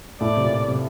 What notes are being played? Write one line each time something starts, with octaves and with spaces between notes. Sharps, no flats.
A2 A3 D5
C3
A#2
C3